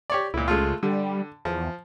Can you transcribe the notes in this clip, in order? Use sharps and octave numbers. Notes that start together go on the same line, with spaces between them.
G4 C#5 D5
C#2 A#2 E4
G#3 A3 F4
D3 G3
E2 F3